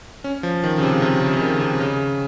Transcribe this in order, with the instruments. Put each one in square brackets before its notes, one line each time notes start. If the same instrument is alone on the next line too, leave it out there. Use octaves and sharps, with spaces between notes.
[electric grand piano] C#4
F3
D#3
C#3
C3
C3
C#3
C#3
D#3
C3
C#3